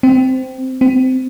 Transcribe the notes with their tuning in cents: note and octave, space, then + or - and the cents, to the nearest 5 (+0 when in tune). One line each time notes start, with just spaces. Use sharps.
C4 -10
C4 -20